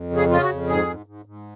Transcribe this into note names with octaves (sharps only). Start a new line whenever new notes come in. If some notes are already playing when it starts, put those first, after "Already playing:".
Already playing: F2
C#3
G#4
C#3 F4
F#4
F2
G#2 G#4
G#2
G#2
G#2